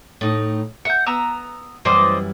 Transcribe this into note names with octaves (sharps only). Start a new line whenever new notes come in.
A2 D#4
E5 F#5 G6
B3 A#5 E6
F#2 E3 G3 C5 D5 D#5